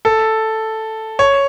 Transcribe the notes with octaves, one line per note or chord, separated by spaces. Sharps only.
A4
C#5